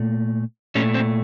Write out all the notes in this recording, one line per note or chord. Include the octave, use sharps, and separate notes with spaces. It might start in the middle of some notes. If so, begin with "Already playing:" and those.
Already playing: A#2 A3
A#2 A3 C#4
C4